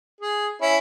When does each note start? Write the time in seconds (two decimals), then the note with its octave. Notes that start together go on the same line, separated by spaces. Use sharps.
0.21 G#4
0.61 C#4 E4